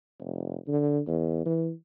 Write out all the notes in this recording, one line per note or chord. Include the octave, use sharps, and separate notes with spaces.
F1
D3
E2
E3